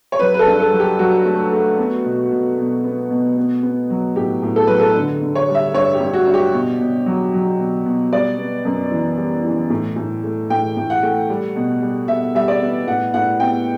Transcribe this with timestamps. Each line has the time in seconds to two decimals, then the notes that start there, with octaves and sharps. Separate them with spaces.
0.12 C#5
0.19 F#3 B4
0.34 B4
0.39 A4
0.47 G2
0.60 A4
0.72 F#3
0.80 G4
0.99 F#3 F#4
1.25 A3
1.53 A3
1.78 B3
2.04 B2
2.31 B2
2.58 B2
2.84 B3
3.10 B2
3.37 B3
3.63 B3
3.90 F#3
4.16 A2 G4
4.42 A2
4.56 A4
4.67 F#3 B4
4.80 A4
4.95 D3
5.22 D3
5.35 C#5
5.49 G3
5.55 E5
5.74 G2 C#5
5.95 G4
6.00 G2
6.14 F#4
6.27 G2
6.34 G4
6.53 B2
6.80 B2
7.06 F#3
7.34 F#3
7.59 B2
7.86 B2
8.13 G3 D5
8.38 B3
8.65 F#2
8.92 E3
9.17 G3
9.44 E3
9.70 A2
9.96 A2
10.24 A3
10.50 A2 G5
10.77 A2
10.90 F#5
11.03 A3
11.30 G3
11.56 B2
11.82 G3
12.08 B2 E5
12.35 G3 E5
12.48 D5
12.61 B3
12.87 A2 F#5
13.14 A2 F#5
13.40 B3 G5